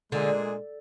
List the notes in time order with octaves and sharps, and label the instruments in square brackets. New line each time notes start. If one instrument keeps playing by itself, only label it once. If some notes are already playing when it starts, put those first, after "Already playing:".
[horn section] A#2 G#3 D4 G#4 [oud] D3